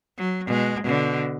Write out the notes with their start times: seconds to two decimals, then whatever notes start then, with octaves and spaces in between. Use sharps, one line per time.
0.18 F#3
0.47 B2 G#3
0.84 B2 D3